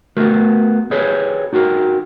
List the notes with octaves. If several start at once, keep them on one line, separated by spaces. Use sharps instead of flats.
A3 B3 F#4 G4 A#4
G4 G#4 B4 C#5
D#4 F#4 G4 A#4